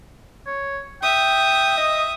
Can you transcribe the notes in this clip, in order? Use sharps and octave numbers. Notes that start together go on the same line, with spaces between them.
C#5
E5 G5 D#6
D#5